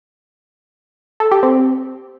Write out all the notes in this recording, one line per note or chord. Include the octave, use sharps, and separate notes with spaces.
A4
G4
C4